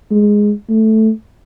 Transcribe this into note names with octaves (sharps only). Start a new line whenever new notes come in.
G#3
A3